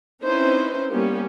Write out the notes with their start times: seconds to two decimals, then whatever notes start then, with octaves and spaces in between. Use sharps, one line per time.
0.23 C4 C#4 D#4 E4 B4 C5
0.91 G3 A#3 B3 C#4 G4